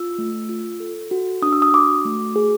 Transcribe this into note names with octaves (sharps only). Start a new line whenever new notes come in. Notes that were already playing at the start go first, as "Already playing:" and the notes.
Already playing: F4 E6
A3
F4
A4
F#4
D4 D#6
E6
D#6
F#4 D6
A3
G#4